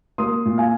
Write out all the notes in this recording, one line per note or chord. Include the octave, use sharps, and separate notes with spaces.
A#3 C6 D#6
A#2
F5 G#5